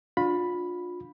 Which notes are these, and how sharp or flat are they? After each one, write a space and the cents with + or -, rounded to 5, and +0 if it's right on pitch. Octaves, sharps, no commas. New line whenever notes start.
D4 +5 F4 +30 B5 +0